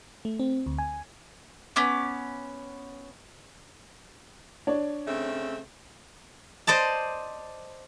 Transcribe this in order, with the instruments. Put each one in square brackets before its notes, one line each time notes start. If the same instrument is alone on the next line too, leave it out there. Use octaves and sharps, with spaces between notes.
[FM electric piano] A3
C4
D2
G#5
[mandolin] B3 C#4 D6
[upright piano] D4 C#5 D5
[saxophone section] C#3 A3 C4
[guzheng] C5 D5 D#5 A5